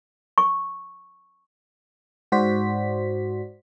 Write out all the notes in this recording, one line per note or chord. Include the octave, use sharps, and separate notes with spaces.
C#6
G#2 F#4 C5 D5 B6